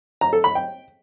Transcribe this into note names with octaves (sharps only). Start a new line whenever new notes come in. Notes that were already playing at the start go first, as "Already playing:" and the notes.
A#5
A4
B5
G5